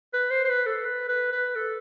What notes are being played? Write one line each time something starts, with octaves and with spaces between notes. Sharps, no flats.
B4
C5
C5
B4
A4
B4
B4
B4
A4